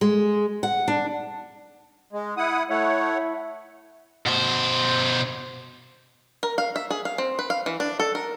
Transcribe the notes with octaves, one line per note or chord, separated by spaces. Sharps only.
G#3
F#5
D4
G#3
E4 F#5 D#6
A3 E4 C#5 F#5
B2 C5
A#4
F5
E5
G#4
F5
C4
B4
F5
E3
D4
A4
A#4